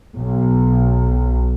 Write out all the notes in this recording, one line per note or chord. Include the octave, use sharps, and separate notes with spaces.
B1